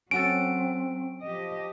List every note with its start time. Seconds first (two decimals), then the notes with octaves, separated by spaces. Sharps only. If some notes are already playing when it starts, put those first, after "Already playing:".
0.11 F#3 C4 C#4 F#4 A4 D7
1.23 F3 G4 D#5